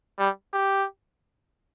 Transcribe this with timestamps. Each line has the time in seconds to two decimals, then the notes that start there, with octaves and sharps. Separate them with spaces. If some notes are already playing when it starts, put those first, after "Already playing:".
0.19 G3
0.53 G4